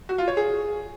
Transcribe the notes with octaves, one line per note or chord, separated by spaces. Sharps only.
F#4
F4
C#5
G#4